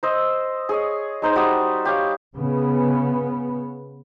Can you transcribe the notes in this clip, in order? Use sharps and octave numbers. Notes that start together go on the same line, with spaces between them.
C5 D#5 E6
G#4 C#5 D#5
G#3 D#4 C5
G3 F#4 D#6
G4 C#5 F5
C#3 B3